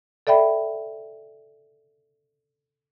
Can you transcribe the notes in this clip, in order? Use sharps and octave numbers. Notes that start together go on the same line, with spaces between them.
A4 D5 E5 G5 B5